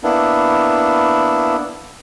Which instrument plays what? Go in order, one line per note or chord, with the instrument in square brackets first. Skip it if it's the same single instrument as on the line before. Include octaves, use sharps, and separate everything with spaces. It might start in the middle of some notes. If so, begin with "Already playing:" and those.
[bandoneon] A#3 B3 D4 E4